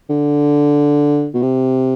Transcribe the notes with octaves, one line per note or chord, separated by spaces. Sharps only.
D3
B2
C3